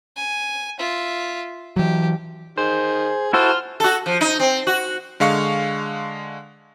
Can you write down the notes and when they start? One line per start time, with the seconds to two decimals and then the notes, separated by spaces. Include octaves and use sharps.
0.17 G#5
0.79 F4 E5
1.76 E3 F#3 G4
2.57 D#3 G#4 C5
3.33 E4 F#4 A4 C5 C6 F6
3.80 F#4 A4
4.06 F3
4.21 D#4
4.40 C4
4.67 F#4
5.20 D3 G#3 F5 C#6 C#7